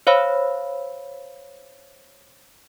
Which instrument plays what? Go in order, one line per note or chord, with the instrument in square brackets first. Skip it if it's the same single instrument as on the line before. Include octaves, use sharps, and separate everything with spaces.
[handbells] C5 C#5 F5 B5 E6